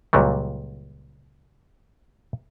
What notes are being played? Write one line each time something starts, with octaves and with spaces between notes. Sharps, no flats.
C#2 A#2 F#3 G3